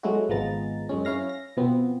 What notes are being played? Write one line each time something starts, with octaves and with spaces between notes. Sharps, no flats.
F#3 G#3 A3 E4 F#4
G#1 F3 G#3 B3 A#5 A6
F#2 G#3 C#4
C#4 E4 F5 A#6
A#6
B2 F3 B3 C4